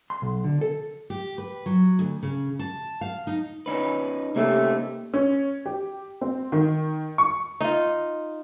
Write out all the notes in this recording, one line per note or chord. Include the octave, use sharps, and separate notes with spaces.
C6
B1
D3
A4
G4
B4
F#3
D2
C#3
A5
F5
D#4
C#4 D#4 B4
C3 A3 A#3 C#4 D#4 G4
C#4
G4
C4
D#3
C#6
D#4 F4